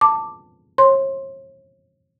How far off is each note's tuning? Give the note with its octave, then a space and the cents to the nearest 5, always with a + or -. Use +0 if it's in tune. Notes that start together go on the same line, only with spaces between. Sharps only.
A5 +15 D6 +0
C#5 -40 C6 +10